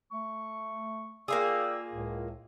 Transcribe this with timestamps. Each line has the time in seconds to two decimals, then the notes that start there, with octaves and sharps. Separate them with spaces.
0.12 A3 C#6
1.28 A#3 F4 G#4 D5 G5 E6
1.93 C#2 A2